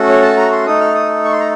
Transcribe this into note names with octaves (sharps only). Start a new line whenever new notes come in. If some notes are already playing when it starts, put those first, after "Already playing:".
Already playing: A3 C#4 F#4 A4
C#5
A5
A#5
C6
A3 D#4 A4 D#6
F6
D#6
C#6
C6
A#5